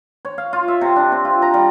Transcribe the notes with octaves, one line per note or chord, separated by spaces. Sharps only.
C#5
F5
F4
E5
C3
D4
C4
F4
A#5
G3